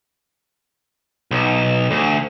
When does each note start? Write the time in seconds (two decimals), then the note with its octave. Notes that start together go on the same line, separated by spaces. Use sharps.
1.31 B1
1.91 D2